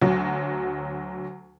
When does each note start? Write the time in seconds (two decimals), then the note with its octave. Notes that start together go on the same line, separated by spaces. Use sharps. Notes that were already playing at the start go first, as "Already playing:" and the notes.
0.01 D2 F#3